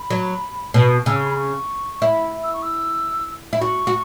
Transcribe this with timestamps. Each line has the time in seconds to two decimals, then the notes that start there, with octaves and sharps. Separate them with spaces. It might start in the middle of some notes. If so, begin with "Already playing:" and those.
Already playing: B5
0.10 F#3
0.74 B2
1.06 C#3 E6
1.16 C#6
1.26 B5
1.35 C#6
2.02 E4
2.44 E6
2.53 C#6
2.62 E6
3.53 E4
3.61 F#4 C#6
3.87 F#4